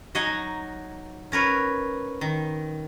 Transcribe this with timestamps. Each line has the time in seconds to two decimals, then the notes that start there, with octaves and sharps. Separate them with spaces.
0.15 F#3 D#4 D#5 F#5 G#5 A#5
1.32 C#4 A#4 B4 C#5
2.21 D#3